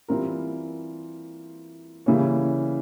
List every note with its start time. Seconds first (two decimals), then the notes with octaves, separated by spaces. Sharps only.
0.08 E3 G3 C4 F4 A#4
2.06 C#3 E3 G3 A#3 C#4